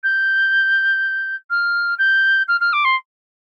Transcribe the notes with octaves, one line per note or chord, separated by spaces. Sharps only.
G6
F6
G6
F6
F6
D6
C6